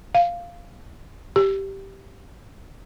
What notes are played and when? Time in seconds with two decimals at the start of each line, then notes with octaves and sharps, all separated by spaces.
0.15 F5
1.36 G4